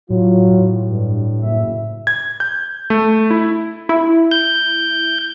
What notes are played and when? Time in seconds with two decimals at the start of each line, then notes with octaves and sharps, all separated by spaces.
0.10 A2 F#3 F4
0.51 A2
0.88 G2
1.41 F#1 E5
2.07 G#6
2.40 G6
2.90 A3
3.31 E4
3.89 E4
4.31 G6